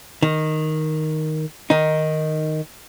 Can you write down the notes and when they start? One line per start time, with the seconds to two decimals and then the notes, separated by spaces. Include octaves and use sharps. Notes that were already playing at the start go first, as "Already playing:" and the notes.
0.22 D#3
1.70 D#3 D#4